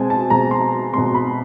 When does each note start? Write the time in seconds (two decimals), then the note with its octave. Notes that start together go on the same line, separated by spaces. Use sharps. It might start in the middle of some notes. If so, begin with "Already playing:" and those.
Already playing: B2 G#3 C4 G#5 A5
0.10 A5
0.30 B2 G#3 C4 A#5
0.51 C6
0.94 B2 G#3 C4 C6
1.14 B5